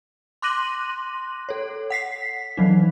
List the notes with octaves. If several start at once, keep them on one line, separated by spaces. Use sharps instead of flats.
C6 D6 F#6 A#6 D#7 F#7
A4 C#5
F#5 B6 C7
D#3 E3 F#3 D#4